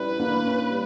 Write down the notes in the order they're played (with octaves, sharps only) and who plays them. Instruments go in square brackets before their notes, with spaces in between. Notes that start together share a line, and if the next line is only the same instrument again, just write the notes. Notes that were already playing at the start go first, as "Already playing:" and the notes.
Already playing: [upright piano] G3 C#4 E4 [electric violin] B4
[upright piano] A#3
C#4
G3